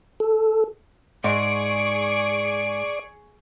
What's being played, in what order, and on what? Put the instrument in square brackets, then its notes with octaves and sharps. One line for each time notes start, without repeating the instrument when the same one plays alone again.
[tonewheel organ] A4
[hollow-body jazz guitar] G#2 [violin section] G#4 C#6 D7 [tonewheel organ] D5